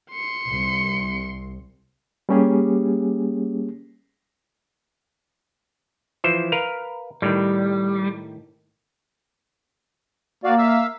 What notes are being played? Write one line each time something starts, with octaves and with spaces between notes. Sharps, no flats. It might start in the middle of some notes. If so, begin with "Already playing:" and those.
C6 C#7
C2
G3 A#3 C#4 G4 G#4
E3 F3 C5
A#4 B4 F5
A2 D#3 G3
A#3 F#4 D5 F5
E5 F5 E6